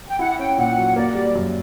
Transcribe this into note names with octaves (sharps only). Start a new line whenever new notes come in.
G5
E4 F#5
C#4 G5
A#2 F#5
F#3
A#3 D5
G3
F#2